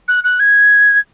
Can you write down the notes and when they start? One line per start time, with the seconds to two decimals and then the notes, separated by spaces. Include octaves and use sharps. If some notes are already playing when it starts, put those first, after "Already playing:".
0.08 F#6
0.24 F#6
0.39 G#6